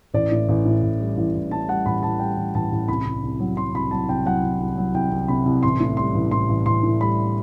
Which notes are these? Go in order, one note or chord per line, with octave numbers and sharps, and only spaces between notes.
A1 D5
A2
A1
A2
A1
G3
A1
A1
A2 A5
G3 F#5
A1 B5
A1 A5
G3 G5
A1
A1 A5
A1
C2 B5
C2
C2
F#3
F#3 C6
C2 B5
F#3 A5
C2 G5
F#3 F#5
C2
C2
F#3
C2 G5
C2
C3 B5
C2
A1 C6
A2
G3 C6
A1
A2 C6
A1
A1 C6
A2
G3 B5